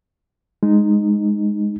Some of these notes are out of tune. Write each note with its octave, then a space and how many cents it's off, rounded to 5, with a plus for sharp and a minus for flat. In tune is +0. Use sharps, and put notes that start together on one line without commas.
G#3 +0 D#4 -15